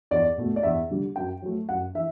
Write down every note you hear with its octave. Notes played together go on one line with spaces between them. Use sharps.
E2 D5
B2 A3
D5
E2 E5
D3 G3
F#2 G5
F#3 A3
F#2 F#5
E3 E5